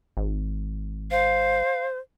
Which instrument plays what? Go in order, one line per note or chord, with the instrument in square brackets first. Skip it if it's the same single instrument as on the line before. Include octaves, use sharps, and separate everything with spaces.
[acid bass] G#1
[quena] C5 [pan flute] F5